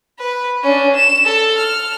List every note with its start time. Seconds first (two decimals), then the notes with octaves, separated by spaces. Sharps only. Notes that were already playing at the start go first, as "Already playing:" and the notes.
0.19 B4
0.63 C#4 D4
0.96 E7
1.25 A4
1.56 F6